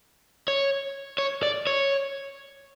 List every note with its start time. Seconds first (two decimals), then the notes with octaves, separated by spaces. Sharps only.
0.48 C#5
1.18 C#5
1.43 D5
1.67 C#5